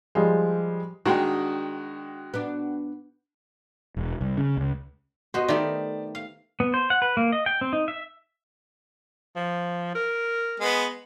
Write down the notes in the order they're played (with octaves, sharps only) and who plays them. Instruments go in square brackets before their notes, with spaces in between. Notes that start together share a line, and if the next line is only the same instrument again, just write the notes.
[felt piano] F3 G3 G#3
[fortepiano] D#3 G#3 [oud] D4 [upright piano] F#4 F#5 G5
[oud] B3 D4
[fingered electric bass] E1
C2
C#3
C#2
[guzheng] B3 C5 [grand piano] F#4 D#5
[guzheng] D#3 A3 G4 [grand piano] D5 E5
[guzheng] F5
[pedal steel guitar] B3
C5
F#5
B4
A#3
D#5
G5
C4
D#4
E5
[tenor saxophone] F3
A#4
[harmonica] G#3 B3